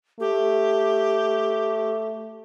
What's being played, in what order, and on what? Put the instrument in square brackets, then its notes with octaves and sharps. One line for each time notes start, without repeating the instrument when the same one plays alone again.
[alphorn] A3 [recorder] G4